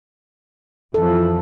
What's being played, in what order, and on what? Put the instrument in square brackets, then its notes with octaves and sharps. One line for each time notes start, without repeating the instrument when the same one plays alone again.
[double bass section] F2 E3 F3 [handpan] A4